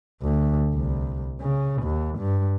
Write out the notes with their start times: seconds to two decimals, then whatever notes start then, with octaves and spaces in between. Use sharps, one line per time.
0.22 D2
0.75 C2
1.40 C#3
1.83 D#2
2.18 G2